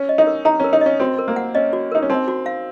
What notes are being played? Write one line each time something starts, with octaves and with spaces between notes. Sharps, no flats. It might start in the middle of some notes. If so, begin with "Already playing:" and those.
Already playing: C#4
D#5
D#4
A#4
D#4 A#5
C#4 A#4
D#4
C#4 D#5
C4 F#4
A#4
A#3
F#5
C#4 D#5
F#4
D#4 A#4
C#4
C4 D#4
F#4
F5